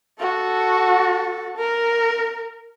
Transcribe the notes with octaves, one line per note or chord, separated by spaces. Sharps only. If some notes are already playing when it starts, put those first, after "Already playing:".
F#4 A4
A#4